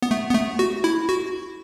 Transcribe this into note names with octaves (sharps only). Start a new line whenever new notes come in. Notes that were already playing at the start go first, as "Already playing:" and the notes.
B3
A3
B3
A3
F#4
E4
F#4